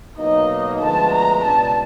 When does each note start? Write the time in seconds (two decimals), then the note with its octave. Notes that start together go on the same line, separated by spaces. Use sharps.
0.18 B2 F#3 A#3 D#4 D#5
0.80 D2 D3 F3 G#3 B3 A5
1.12 A#5
1.43 C#2 B2 G3 B3 D4 A5